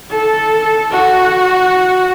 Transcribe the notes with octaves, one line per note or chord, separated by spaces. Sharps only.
A4
F#4